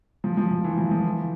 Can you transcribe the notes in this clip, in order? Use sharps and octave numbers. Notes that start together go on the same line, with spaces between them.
F3
F3
F3
E3
F3
F3
E3